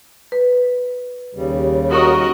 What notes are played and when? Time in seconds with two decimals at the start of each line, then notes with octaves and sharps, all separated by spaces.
0.32 B4
1.34 D#2 C#3 G3
1.91 F#4 A#4 D#5